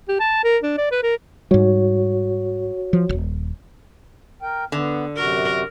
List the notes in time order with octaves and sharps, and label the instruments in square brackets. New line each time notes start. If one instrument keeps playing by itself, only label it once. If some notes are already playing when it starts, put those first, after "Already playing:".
[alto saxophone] G4
A5
A#4
D4
D5
B4
A#4
[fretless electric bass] G#2 G3 [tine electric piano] F#4 C#5
[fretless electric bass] F3
D#1 G#1
[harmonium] A#4 G5
[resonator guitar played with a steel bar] D3 [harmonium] B3
[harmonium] F#2 C3 F#4 [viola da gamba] A#4